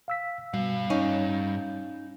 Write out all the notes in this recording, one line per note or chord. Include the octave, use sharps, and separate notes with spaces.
F5 E6 B6
G2 B2 G3 F5
C#4 D#4